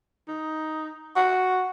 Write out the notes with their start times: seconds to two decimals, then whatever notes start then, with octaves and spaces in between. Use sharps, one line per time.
0.28 D#4
1.16 F#4